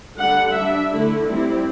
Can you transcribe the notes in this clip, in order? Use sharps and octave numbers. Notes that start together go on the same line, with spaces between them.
D3 G3 D4 F#5
G3 D4 E5
D3 A3 E4
G3 C4 E4